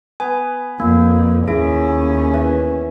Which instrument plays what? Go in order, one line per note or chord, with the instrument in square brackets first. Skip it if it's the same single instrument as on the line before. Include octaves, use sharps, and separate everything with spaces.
[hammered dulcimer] B3 [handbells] G#5
[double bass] F2 [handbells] A#3
[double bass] D#2 C#4 [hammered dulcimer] E4 [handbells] G#4
[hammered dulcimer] E3